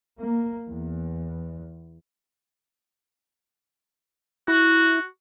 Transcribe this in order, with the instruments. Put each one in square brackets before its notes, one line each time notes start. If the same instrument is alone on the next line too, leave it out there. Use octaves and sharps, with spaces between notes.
[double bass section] A#3
E2
[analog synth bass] E4 [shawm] F#4